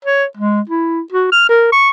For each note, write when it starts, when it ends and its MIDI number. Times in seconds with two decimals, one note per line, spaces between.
0.05 0.24 73
0.37 0.60 56
0.69 1.00 64
1.12 1.28 66
1.32 1.45 89
1.49 1.68 70
1.72 1.90 85